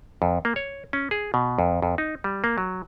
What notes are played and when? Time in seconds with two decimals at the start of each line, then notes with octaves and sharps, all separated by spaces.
0.22 F2
0.45 A#3
0.56 C#5
0.93 C#4
1.11 G#4
1.34 B2
1.59 F2
1.82 F2
1.98 D#4
2.24 G3
2.44 A#3
2.58 F#3